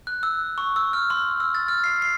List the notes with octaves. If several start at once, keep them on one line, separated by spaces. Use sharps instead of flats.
F#6
E6
C#6
E6
F6
C6
E6
A6
F6
C7
C7